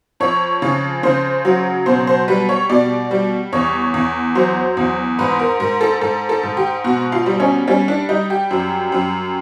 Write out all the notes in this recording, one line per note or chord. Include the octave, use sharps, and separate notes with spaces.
F2 C#5
C#3
C#3 C5
F#3
B2 C5
C5
G3 B4
C#5
B2 D5
G3
E2 C#5
E2
F#3 C5
E2
G#2 B4
A#4
G#2 A#4
A4
G#2 A4
A4
G#2
G4
B2 F#4
F4
G3
C#4
G3 C#4
D4
G3 D#4
G4
F#2
F#2